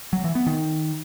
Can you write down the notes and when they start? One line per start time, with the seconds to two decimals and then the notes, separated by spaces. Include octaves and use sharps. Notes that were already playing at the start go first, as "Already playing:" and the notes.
0.13 F#3
0.24 E3
0.35 B3
0.47 D#3